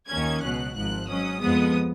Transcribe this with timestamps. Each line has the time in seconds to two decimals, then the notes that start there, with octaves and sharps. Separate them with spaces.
0.09 D#2 D#3 A#3 C#4 G#6
0.41 C#2 B2 F#3 F#6
0.74 G#1 G#2 F3 F#6
1.07 G#2 F#3 C#4 D#6
1.40 F2 F3 G#3 B3 D#6